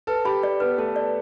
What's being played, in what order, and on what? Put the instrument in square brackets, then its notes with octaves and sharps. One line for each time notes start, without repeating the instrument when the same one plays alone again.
[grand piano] A4 [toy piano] B4
[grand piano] G4 [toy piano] B5
[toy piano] D5
[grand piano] B3 [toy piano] B4
[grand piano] A3 [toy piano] A5
[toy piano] D5